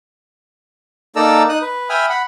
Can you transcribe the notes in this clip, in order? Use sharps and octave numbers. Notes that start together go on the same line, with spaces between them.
A#3 D#4 A4 D5 A#5 E6
D#4 D#6 F#6
B4
E5 G5 G#5 B5 D#6 F6
F#5 B5